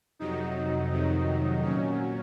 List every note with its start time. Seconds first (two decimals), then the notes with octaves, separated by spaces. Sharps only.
0.19 F2 C3 F#3 D#4
0.91 F2 C3 D#3 F#3
1.63 A#2 F#3 C#4